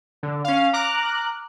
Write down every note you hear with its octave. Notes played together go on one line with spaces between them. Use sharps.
D3
C#4 F5
A#5 D6 F6 F#6